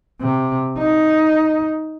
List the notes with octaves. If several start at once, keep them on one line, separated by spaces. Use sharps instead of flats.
C3
D#4